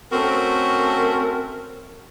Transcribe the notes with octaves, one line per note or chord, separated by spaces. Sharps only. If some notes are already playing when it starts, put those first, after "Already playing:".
A3 C4 C#4 F#4 A4 A#4